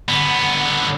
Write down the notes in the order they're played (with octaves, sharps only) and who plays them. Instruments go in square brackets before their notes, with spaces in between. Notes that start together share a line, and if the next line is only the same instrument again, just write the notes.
[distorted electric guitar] D3 B3